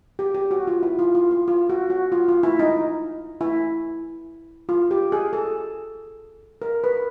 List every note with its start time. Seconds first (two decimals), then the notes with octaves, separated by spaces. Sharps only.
0.19 G4
0.35 G4
0.51 F#4
0.67 F4
0.83 E4
0.99 F4
1.15 F4
1.31 F4
1.48 F4
1.70 F#4
1.90 F#4
2.12 F4
2.28 F4
2.43 E4
2.59 D#4
3.41 E4
4.69 F4
4.91 G4
5.12 G#4
5.33 A4
6.62 A#4
6.84 B4